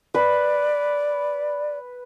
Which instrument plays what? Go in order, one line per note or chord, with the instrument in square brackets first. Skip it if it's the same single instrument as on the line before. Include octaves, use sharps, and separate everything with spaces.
[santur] B4 [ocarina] D5